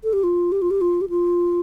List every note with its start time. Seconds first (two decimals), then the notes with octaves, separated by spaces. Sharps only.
0.04 A4
0.13 G4
0.23 F4
0.52 G4
0.62 F4
0.71 G4
0.81 F4
1.01 G4
1.09 F4